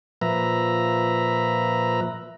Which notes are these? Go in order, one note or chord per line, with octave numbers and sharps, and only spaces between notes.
A#2 F3 B4 E5 A#5